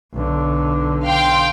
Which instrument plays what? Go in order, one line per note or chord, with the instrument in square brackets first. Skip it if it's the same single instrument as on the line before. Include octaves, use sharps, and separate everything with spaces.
[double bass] B1 D3
[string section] F5 G5 C6